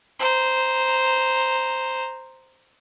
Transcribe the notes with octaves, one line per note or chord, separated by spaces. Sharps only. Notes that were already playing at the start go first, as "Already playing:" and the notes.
C5 A#5